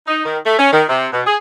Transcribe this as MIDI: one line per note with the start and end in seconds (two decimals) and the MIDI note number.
0.08 0.22 63
0.25 0.38 51
0.46 0.59 57
0.59 0.71 61
0.72 0.82 51
0.89 1.07 48
1.12 1.22 47
1.26 1.36 68